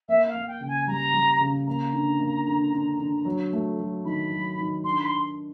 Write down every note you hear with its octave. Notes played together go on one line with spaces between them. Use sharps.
A#3 E5
F5
A#3
G5
C#3
G#5
G3 A#5
G3
C#3
A#3 A#5
D3
A#3
D3
D3
D3
F#3
A3
F#3
D#3 B5
F#3
D#3
D4 C6
B5
C6